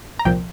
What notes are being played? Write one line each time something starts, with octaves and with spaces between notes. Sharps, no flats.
A#5
C2 A#2 F3 G5